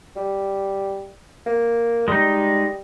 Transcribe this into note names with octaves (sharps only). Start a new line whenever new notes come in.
G3
A#3
G3 G#3 D#4